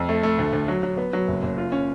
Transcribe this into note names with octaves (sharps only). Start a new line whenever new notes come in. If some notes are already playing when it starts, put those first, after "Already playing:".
Already playing: F2
A3
A3
D2
D2
F#3
F#3
B3
F#3
F#1
F#1
F4
C#4